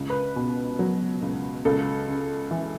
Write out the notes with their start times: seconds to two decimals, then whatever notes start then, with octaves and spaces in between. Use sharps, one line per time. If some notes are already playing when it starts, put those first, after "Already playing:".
Already playing: C#2
0.10 B4
0.36 B2
0.79 F#3
1.22 C#2
1.65 C#2 A4
2.08 C#3
2.51 E3